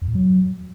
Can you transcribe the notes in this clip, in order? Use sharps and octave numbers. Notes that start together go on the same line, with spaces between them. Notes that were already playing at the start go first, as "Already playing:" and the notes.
F2
A2
F#3